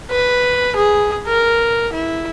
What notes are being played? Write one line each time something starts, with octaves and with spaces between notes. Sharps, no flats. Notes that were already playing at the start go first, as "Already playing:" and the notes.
B4
G#4
A#4
E4